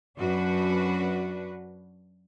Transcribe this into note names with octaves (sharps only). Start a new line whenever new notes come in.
F#2 D4 F#4 B4